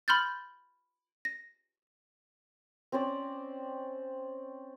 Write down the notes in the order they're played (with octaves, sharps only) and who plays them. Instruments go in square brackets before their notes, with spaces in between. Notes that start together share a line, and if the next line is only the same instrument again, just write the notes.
[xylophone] B5 C6 F6 G6 A6
A#6
[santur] C4 C#4 C5 D5